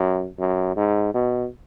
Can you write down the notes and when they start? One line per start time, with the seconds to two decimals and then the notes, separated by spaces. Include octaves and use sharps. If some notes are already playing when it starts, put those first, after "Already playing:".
Already playing: F#2
0.39 F#2
0.76 G#2
1.14 B2